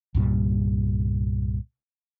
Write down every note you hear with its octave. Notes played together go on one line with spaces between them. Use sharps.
C2 G2 A#2 G3